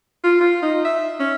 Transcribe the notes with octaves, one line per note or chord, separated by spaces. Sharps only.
F4
F4
D#4
E5
C#4